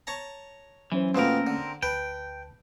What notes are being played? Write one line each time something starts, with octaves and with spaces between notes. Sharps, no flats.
C#5 A5 A#5
E3 F#3 C#4 C5
F2 B2 F3 A3 A#3 C4 C#4 A#4
D3
D2 B4 G5 A5